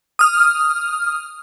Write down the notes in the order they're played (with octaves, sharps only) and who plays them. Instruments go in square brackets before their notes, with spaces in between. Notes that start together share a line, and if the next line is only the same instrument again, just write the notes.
[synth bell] D#6 F6